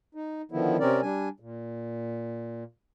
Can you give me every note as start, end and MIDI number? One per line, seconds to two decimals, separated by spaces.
0.15 0.42 63
0.52 0.77 50
0.52 0.77 51
0.52 0.77 53
0.52 0.77 59
0.52 0.77 64
0.80 1.01 48
0.80 1.01 60
0.80 1.01 61
0.80 1.01 70
0.80 1.01 74
1.02 1.29 55
1.02 1.29 62
1.02 1.29 80
1.40 2.64 46